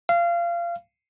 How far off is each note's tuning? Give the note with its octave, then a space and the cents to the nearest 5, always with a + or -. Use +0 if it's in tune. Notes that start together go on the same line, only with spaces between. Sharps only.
F5 -25